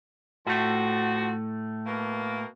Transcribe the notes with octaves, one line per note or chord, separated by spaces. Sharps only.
A2 F3 A3 C4 F#4
B2 A#3